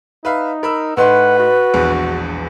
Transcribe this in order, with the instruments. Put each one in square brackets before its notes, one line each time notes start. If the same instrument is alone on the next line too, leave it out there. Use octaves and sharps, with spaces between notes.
[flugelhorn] D#4 [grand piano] B4 E5 F5
[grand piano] A#4 B5 E6
[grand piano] A2 D#4 C6 [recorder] B4 [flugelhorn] F#5
[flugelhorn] F#4
[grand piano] E1 A#1 E2